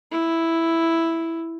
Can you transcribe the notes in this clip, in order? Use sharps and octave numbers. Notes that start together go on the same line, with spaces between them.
E4